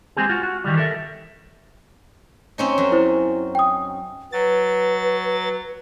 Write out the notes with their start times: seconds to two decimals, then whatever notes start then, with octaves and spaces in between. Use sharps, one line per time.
0.17 G#3 C4 G4 G#4
0.29 F4 F#4
0.43 F#4
0.64 D#3 E3 G3
0.77 A4 A#4 E5
2.58 C4 C#4 D#4
2.78 F#2
2.92 E4 C5
3.55 G5 D#6
4.32 F#3 B4 A6